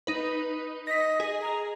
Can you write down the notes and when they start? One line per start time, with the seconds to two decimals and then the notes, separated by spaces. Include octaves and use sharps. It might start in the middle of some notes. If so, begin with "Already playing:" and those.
0.07 D#4 B4
0.87 D#5 A#6 B6
1.20 G#4
1.42 A#5